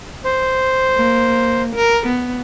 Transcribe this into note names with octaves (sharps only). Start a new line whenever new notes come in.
C5
A#3
A#4
B3